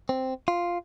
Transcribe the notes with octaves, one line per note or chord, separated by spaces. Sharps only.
C4
F4